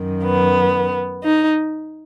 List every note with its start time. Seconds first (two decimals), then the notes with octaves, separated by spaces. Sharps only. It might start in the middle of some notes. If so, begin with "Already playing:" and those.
Already playing: F#2 D#3
0.23 B3
1.23 D#4